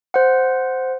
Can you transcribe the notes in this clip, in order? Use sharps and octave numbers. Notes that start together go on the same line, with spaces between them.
C5 F#5